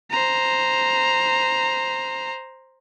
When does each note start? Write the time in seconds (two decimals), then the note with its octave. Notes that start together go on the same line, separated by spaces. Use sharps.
0.10 C5 A#5